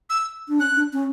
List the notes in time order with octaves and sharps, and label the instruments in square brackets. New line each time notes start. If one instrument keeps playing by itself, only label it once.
[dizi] E6
[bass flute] D4
[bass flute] C#4 [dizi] F#6
[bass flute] D4
C#4